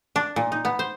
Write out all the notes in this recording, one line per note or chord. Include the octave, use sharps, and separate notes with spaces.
D4
A#2
D#4
B3
C5